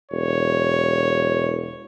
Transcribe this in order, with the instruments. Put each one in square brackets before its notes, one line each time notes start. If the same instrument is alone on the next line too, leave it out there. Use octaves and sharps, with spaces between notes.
[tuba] E1 [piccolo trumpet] C#5